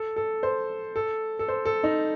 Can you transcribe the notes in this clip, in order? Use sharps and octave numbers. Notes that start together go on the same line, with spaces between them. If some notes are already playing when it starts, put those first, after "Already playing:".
Already playing: A4
A4
C5
A4
A4
C5
A4
D#4